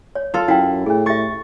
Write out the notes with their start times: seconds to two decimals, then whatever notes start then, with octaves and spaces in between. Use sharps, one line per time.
0.15 C#5
0.34 F4 A4
0.48 F#2 E4 F#5 G5
0.86 A2 C#4 G#4
1.06 G4 E5 C#6 A6